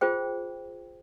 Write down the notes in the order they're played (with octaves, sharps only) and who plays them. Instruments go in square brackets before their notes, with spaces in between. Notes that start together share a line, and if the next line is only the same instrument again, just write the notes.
[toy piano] F4 G#4 C5 G5